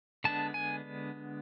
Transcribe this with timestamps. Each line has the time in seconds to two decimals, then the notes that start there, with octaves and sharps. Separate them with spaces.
0.24 D3 G#3 B3 D4 A5
0.54 G#5